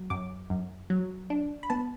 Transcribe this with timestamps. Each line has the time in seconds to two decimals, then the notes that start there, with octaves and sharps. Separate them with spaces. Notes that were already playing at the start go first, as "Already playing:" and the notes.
Already playing: F#3
0.10 F#2 D6
0.50 F#2
0.90 F#3
1.30 D4
1.63 B5
1.70 B3 A5